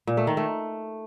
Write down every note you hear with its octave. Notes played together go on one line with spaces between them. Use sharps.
A#2
A3
D#3
A3